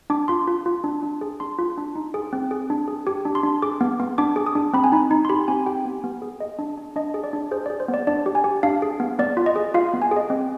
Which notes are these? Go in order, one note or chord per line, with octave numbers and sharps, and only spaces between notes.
D4 D6
F4 C6
F4
F4
D4
D4
G#4
D4 C6
F4
D4
D#4
G#4
C4
G#4
D4
G#4
G4 D6
D4
C6
D4
G#4 D6
B3
B3
D4 D6
G#4
D#6
D4
C4 B5
G#5
D#4 B5
D#4
C6
G4 B5
C4 G#5
G4 G5
B3
B3
G#4
G#4 D#5
D4
D4
D4 D#5
G#4
D5
D4
G#4 C5
D5
G#4
C5
B3
D5
D4 D5
G4
G#5
G4
D4 F5
G#4
B3
B3 D5
F4
D#5
G#4
F4 F5
B3
G#5
G#4
D#5
C4 D#5